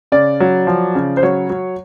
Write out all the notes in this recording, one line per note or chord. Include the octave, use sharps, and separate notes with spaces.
C#3 D5
F#3
F3
C#3
C5
F#3 C#5
F#3